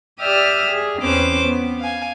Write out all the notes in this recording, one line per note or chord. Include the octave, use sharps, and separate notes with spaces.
G4 D5 E5 D#6 F6
G#4
E2 C4 C#4 B4 C5 D6
B3
F5 G#5